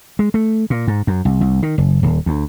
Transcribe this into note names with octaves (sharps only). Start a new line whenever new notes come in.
G#3
A3
A#2
G#2
F#2
C2
C2
D#3
F#1
D#1
D2